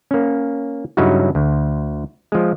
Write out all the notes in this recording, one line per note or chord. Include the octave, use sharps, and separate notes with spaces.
A#3 C#4
G2 C#3 F#3 D#4 E4 F#4
D2
F3 G#3